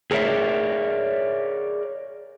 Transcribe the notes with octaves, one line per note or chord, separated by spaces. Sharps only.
G#4 A#4 C#5 D5 E5